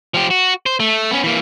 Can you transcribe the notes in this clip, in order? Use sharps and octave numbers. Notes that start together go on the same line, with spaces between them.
F3 G4
F#4
C5
A3
B3 C#4
E3 A#3